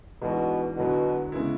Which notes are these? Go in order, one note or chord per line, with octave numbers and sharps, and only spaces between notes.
G#2 B2 E3 G#3 D4 F#4
E2 B2 D3 F#3
C#3 G#3 B3 E4